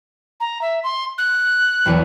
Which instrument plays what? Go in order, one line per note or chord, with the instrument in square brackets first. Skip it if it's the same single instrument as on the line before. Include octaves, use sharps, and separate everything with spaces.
[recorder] A#5
E5
C6
F#6
[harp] E1 B1 E2